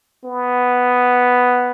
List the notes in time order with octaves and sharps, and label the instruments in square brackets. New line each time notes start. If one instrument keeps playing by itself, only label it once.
[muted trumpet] B3